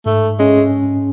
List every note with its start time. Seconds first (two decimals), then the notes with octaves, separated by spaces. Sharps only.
0.06 G#2 A3
0.39 G#3 C#4